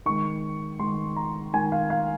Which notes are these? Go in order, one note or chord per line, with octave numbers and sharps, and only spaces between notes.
D#3 G#3 C#6
D#3 G#3 C6
A#5
D#3 G#3 G#5
F5
F5